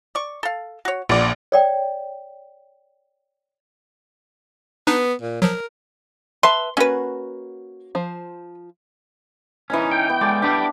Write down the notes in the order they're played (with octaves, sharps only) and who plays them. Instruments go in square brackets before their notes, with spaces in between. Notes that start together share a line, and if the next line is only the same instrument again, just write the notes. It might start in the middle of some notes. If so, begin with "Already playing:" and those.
[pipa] D5 C#6
A4 F5
F#4 C#5
[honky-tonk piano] A#1 D5 [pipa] B3
[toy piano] C#5 D5 G5
[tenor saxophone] B3 [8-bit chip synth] D4 D#4 B4
[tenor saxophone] A#2
[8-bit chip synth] F3 F#3 [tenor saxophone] A#4
[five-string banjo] B4 E5 A5 [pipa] C6
[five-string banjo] A#3 F#4 F#5 [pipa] C#4 B4
[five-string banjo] F3 C5
[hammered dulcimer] E3 D#5 A#5 [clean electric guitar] C#4 D#4
[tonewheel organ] G5
[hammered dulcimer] B3
[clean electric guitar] G#3 D5 [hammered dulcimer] A4
[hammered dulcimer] D4 [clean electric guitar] G4 B4 D5